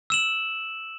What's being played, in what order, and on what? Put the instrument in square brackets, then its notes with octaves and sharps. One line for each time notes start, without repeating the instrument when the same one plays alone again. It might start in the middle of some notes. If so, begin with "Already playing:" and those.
[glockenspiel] E6 E7 F#7